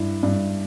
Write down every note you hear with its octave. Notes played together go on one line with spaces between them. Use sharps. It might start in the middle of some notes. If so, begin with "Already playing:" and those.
Already playing: G2 E4
G2